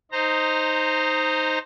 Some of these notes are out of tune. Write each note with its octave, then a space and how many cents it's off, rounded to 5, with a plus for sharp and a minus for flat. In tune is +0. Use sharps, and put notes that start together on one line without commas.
D#4 +0 C5 +0 A#5 -15